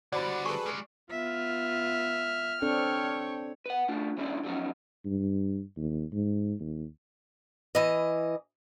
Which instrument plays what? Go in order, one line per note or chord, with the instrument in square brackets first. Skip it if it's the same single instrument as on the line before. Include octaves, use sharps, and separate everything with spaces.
[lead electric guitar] D3 G3 [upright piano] F#4 C5 B5 [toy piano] D5 [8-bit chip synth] F#5 A6
[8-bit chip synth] G#4 A4 B4 [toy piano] C#6
[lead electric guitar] G3 G#3
[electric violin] B3 F4 [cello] E5 [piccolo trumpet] F6
[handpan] C4 D4 A4 [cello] C#5 [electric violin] G5 C#6
[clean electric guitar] B4 F#5
A3 D4 F4
E3 G#3 C#4 D4 E4
D3 F3 F#3 B3 C#4 D#4
[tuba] G2
D#2
G#2
D#2
[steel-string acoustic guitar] E3 D#5